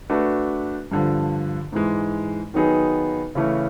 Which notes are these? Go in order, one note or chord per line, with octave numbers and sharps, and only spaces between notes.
A3 D4 F#4 B4
G2 D3 F3
G#2 E3 G#3
D#3 F#3 B3 D#4 G#4
C#3 E3 A3 C#4